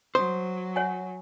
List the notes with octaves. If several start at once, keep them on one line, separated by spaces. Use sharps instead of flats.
F#3 C5 D#6
C#5 F#5 G#5